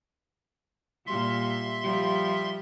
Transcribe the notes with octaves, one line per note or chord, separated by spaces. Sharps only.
A#2 G3 E5 C6
F3 G3